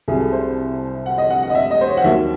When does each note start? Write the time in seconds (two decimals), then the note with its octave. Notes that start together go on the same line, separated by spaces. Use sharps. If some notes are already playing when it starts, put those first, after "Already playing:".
0.08 C2 C3 F#3 G#4
0.20 A4
0.32 C5
1.06 F#5
1.18 D#5
1.30 F#5
1.43 F#5
1.50 D#5
1.55 E5
1.71 D#5
1.81 C5
1.87 C#5
1.97 F#5
2.04 D#2 D#3 F#3 E5